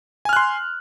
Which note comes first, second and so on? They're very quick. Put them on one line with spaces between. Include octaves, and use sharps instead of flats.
G#5 F6 F#6 C6